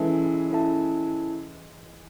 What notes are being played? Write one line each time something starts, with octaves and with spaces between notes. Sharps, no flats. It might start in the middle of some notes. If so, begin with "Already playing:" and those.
Already playing: E3 G#3 C#4 E4 A4 E5 A5
C#4 E4 A4 E5 A5